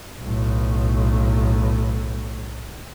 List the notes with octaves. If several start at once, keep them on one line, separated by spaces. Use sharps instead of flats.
B1 A2